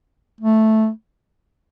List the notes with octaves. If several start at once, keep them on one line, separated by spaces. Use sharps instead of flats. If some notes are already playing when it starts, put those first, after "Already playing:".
A3